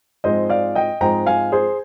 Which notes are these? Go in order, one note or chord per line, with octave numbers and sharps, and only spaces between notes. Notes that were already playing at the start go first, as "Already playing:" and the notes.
G#2 F3 G#3 C4 C5 D#5
D5 F5
D#5 G5
G#2 F3 G#3 C4 G5 A#5
F5 G#5
G#4 C5